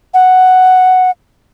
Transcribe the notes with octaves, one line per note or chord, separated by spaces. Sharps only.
F#5